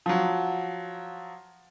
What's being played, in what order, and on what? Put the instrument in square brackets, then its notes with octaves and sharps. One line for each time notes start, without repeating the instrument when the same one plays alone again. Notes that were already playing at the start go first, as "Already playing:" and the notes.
[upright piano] F3 F#3